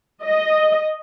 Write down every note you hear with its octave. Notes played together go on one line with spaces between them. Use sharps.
D#5